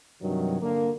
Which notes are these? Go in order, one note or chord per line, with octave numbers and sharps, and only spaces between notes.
G2 C3 D#3 E3 F#3
D3 A#3